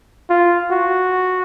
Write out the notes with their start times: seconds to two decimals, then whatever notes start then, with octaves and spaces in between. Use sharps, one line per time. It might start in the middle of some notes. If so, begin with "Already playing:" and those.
0.30 F4
0.71 F#4